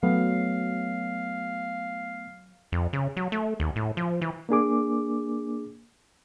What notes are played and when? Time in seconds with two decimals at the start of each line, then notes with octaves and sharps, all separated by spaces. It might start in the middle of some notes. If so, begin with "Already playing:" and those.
0.03 F#3 A3 B3 F5
2.72 F2
2.93 C#3
3.17 F#3
3.32 A3
3.60 D#2
3.76 A2
3.97 F3
4.22 E3
4.49 A#3 D4 G#4 D6